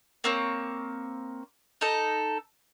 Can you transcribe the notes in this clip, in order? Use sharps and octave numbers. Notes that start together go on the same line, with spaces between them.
A#3 C4 C#5
D#4 A4